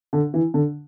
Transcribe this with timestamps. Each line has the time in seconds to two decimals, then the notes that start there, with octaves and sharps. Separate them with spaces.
0.13 D3
0.34 E3
0.54 D3